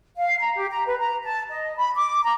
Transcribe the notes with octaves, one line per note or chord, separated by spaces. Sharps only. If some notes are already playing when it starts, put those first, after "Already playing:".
F5
A#5
G4
A#5
B4
A#5
A5
D#5
B5
D6
A#5